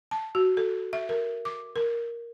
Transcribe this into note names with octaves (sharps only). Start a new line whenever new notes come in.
A5
F#4
A4
E5
A#4
D6
A#4